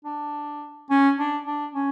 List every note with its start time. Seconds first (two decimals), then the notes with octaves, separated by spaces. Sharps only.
0.05 D4
0.90 C#4
1.18 D4
1.46 D4
1.74 C#4